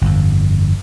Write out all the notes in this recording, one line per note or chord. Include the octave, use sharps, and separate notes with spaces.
G1 F2